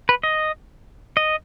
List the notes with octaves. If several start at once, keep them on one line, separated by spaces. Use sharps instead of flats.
B4
D#5
D#5